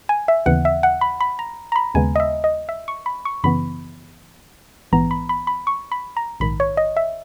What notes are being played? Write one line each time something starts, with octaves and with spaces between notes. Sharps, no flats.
G#5
E5
D#2 C#3 E3 B3 F#5
E5
F#5
B5
B5
A#5
A#5
B5
D#2 C#3 G#3 B3 G#5
D#5
E5
D#5
E5
C#6
B5
C#6
F#2 C#3 E3 B3 B5
A#1 G#2 E3 B3 A#5
B5
B5
B5
C#6
B5
A#5
A#1 G#2 D#3 B5
C#5
D#5
E5